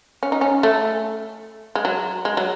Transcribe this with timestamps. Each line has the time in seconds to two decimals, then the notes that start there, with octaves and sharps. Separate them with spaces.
0.23 C#4
0.32 D#4
0.41 C#4
0.63 A3
1.75 G#3
1.85 F#3
2.25 G#3
2.37 F#3